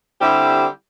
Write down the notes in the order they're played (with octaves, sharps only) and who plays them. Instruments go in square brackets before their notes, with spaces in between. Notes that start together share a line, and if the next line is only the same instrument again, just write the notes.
[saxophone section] D3 G3 C4 E4 G4